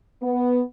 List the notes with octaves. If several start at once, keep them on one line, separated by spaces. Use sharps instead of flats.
B3